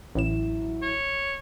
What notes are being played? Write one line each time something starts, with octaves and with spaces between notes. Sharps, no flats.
A1 A2 F#3 E4 E7
C#5